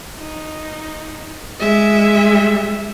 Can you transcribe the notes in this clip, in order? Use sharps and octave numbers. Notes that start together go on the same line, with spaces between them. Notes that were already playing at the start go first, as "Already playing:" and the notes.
D#4
G#3 E5